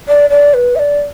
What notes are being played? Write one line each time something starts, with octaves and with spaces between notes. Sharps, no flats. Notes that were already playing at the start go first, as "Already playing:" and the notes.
D5
D5
B4
E5
D5